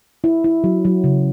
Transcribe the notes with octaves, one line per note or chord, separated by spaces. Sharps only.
E4
E4
F#3
F#3
C#3